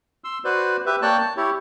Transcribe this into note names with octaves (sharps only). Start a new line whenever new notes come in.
C6 E6
F#4 B4 C5 D5
G4 B4 E5
A#3 C#5 D5 G5 A5 F#6
A5
E4 G4 C#5